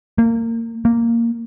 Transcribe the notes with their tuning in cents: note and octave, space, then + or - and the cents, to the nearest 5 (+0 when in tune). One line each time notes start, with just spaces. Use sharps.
A#3 -25
A#3 -5